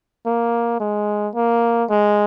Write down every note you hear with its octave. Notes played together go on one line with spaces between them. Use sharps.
A#3
G#3
A#3
G#3